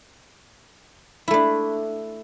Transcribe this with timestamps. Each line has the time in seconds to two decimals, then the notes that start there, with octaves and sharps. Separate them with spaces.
1.28 E4
1.31 A3
1.34 D4